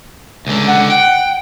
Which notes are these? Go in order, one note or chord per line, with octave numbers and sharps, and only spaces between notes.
C#2 D3
F#5
F#5 G5